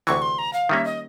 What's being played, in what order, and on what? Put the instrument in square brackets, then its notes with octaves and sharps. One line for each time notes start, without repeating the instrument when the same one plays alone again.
[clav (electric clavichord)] D2 C3 E3 [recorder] C#6
[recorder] C6
A#5
F5
[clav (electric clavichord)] D#3 G3 A#3 C#4 [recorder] E5
[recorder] D#5